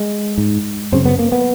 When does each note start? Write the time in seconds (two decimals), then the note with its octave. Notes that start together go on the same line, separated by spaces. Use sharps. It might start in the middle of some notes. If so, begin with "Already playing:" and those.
Already playing: G#3
0.38 G#2
0.92 F#2 C#3 C4
1.05 B3
1.19 A#3
1.32 B3